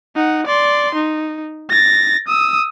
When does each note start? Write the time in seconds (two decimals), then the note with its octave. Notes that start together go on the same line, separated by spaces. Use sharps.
0.16 D#4 F#5
0.47 D5 C6
0.95 D#4
1.70 A6 A#6
2.28 D#6 E6